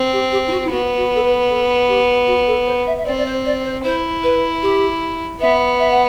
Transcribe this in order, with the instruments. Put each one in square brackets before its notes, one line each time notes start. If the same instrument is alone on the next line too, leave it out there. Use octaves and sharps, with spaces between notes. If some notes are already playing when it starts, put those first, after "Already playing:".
Already playing: [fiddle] C4
[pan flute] G4
G4
E4
F#4
E4
[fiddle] B3 [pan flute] F#4
[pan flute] F#4
A4
B4
A4
G4
F#4
A4
C5
E5
E5
[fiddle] C4 [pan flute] D5
[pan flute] D5
C5
D5
C5
[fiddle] E4 [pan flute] C5
[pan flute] B4
G4
[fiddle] B3 [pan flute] E5
[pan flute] E5
F#5